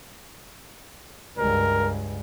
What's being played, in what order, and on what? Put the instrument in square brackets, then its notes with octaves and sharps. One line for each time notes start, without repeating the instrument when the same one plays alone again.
[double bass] C#2 G2 [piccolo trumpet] A#4